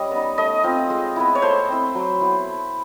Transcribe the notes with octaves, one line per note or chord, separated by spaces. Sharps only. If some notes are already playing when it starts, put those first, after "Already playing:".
Already playing: G3 C#4 D#5
B3 D#4
A3 D#5
C4 F4
G#3
B3 E4
C#5
A3 C5
C4 E4
F#3
B3 E4